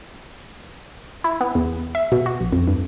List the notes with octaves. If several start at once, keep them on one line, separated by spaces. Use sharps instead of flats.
E4
B3
E2
E5
B2
F#4
A#1
F2
G2